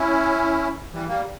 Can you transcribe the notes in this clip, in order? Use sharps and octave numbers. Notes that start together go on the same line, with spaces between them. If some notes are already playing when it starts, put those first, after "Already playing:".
Already playing: C#4 E4
E3 G3
G3 A#3